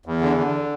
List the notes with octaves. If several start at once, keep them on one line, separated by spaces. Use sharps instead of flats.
E2
D3
D3